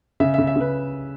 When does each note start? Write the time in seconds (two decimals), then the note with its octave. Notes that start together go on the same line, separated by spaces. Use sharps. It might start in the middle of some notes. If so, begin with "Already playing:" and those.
0.20 C#3 E5
0.34 E5
0.38 C#3
0.47 E5
0.56 C#3 B4